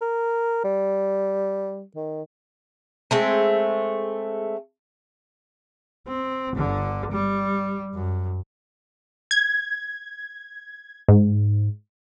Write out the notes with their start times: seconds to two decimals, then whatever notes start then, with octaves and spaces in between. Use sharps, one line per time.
0.01 A#4
0.64 G3
1.96 D#3
3.11 G#3 A3 C4
6.07 C4
6.56 G1 D3
7.12 G3
7.94 F#2
9.31 G#6
11.08 G#2